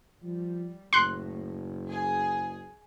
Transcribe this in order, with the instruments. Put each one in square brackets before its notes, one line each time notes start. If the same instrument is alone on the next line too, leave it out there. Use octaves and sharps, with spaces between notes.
[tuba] F3 [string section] G3
[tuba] F#1 [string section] A2 [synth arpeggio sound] C6 F#6
[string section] G#4